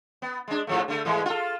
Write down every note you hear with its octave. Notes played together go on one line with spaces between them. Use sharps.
B3
G#3 D4
G#2 F3 A3
D3 A3
G#2 E3 G#3
F4 A4